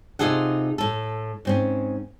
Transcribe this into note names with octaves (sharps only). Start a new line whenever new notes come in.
C3 D#4 F4 G#4 A4 F#5
A2 A4
G#2 C4 C#4